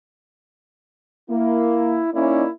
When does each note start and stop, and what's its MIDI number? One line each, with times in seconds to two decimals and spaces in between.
1.30 2.00 58
1.30 2.12 64
2.14 2.49 58
2.14 2.43 61
2.14 2.43 63
2.14 2.49 64
2.14 2.43 74